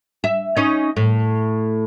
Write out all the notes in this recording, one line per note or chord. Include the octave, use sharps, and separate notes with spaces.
E5
C#4 D#4
A2